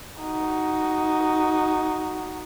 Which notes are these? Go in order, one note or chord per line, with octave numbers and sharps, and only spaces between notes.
D#4 F#4